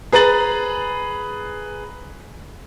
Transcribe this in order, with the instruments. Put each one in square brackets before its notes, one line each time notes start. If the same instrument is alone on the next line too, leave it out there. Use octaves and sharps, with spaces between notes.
[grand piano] G#4 B4 A#5 A6 F#7